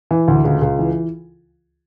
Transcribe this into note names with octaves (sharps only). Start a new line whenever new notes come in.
E3
D2
C#2
C#2
E3